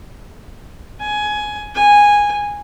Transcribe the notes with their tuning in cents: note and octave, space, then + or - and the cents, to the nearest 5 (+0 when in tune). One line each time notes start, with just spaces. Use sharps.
G#5 +15
G#5 -10